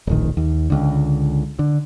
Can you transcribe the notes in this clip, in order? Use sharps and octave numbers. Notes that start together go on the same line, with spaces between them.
D1 A#1 D#3
D#2
C#2 D3
D3